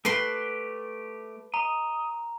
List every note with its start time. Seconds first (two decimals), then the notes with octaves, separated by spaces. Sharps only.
0.05 A3 G4 B4 C6
1.54 D#5 A#5